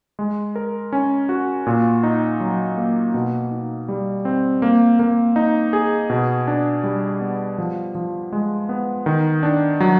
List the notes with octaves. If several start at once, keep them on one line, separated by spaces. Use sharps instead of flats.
G#3
A#4
C#4
F#4
A#2
D#4
F#3
A#3
B2
D#4
G3
C4
A#3
A#3
D#4
G#4
B2
D4
G3
B3
F3
F3
G#3
B3
D#3
D4
F#3